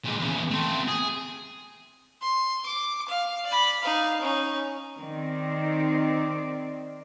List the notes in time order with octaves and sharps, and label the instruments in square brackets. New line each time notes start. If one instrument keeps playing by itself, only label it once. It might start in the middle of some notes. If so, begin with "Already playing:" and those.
[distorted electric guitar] A#2 G#3
E2 C#3
A3 C4
G#4
[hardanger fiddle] C6
D6
F5
D5 B5
D#4 F5
C#4 D#4
[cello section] D#3 C4 D5